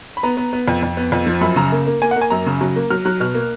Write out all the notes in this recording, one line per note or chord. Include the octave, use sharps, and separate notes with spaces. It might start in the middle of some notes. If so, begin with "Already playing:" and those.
B5
B3 A#5
B3
B3
F2
F2
B3
F2
F3
F#2 B5
C#3 A#5
A#3
A#3
A#3 G#5
F#5
A#3
G#5
F#2 A#5
C#3
F#3
A#3
F#3 F6
F#3 F#6
B2 F6
A#3